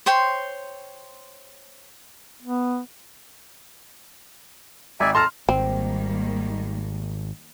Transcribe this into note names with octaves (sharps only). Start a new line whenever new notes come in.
C5 C#5 G5 C6
B3
G#1 D5 E5 G#5
A4 A5 A#5 C6 F6
G#1 D#3 G3 A#3 C4